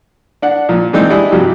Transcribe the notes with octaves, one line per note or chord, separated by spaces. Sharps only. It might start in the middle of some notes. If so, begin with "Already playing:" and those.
D4 F#5
A#2 F3
E3 G#3 C4 D4 D#4
G3 D4 E4 G#4 D#5
G2 C3 F3 F#3 G4